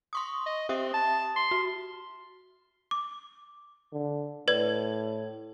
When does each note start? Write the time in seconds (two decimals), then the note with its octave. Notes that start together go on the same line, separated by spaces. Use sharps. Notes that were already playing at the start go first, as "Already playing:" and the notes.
0.13 C6 C#6 D#6
0.46 D#5
0.69 C4 G4 E5 D#6
0.94 A5
1.36 C6
1.51 F#4
2.91 D6
3.93 D3
4.48 A2 B4 D5 G#6